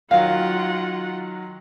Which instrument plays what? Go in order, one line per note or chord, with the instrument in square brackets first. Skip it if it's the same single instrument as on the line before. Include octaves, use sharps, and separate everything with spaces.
[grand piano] D#3 F#3 [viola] F4 F#5 [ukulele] F5